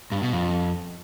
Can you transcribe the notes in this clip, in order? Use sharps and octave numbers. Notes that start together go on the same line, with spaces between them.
G2
B2
F2